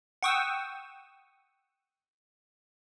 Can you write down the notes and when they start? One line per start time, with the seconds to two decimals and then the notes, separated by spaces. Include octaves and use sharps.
0.23 F#5 G5 C#6 D#6 E6